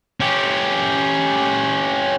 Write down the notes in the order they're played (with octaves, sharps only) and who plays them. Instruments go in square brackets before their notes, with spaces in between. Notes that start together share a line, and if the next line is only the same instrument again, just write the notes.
[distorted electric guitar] C#4 G4